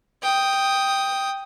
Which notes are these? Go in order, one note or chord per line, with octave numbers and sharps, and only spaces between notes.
G5 D#6